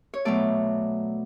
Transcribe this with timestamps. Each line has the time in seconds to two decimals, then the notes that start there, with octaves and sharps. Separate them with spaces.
0.14 C#5
0.25 B2 F#3 A3 D5